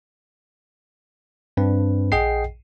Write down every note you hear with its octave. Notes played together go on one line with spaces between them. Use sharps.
G2 C4 D4 B4
A#1 G#4 D#5 F#5 G5 C7